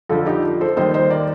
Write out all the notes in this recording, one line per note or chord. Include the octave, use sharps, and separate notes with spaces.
F2 D3 F3 F4 A4
D#4 G4
A4 C5
D#2 D#3 G3 C5 D#5
C5 D#5
A#4 D5